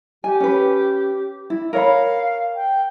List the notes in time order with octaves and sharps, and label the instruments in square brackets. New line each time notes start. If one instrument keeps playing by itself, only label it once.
[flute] G4 [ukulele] G#5
[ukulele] C#4 B4
E4
[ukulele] A#4 C#5 B5 [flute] F5
[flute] G5